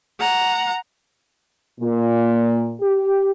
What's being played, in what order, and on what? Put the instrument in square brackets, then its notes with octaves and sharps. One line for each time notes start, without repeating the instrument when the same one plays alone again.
[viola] F#5 A#5
[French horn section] A#2
G4